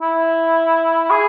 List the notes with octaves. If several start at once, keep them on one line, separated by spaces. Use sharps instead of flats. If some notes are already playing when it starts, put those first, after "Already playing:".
E4
G#4